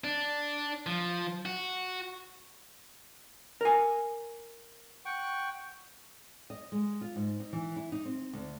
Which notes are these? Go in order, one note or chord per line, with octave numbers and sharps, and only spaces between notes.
D4
F3
F#4
A#4 G#5
F#5 G5 C#6
D#5
G#3
F4
G#2
D#4
E3
E4
D#4
C4
D2